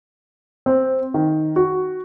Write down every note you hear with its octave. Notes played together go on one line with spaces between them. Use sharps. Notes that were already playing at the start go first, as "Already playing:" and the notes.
C4
D#3
F#4